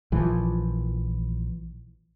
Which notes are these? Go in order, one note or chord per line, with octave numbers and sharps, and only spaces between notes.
A#1 E3 F3